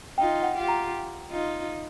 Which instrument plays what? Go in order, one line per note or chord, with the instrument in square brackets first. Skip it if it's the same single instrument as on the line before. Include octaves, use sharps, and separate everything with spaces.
[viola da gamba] D#4 F4 [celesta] G5
[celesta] F#5
[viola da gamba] F4 G4
[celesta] A#5
[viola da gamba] D#4 F4